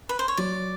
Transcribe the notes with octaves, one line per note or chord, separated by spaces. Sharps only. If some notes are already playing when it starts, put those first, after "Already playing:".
B4
C5
C#5
F#3 D5